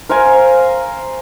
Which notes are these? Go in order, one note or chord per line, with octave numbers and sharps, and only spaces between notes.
A#4 C5 F5 G#5